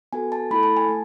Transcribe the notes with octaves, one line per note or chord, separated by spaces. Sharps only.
B3 F#4 A4 G#5
A5
A3 E4 A4 B5
A5
G#5
A3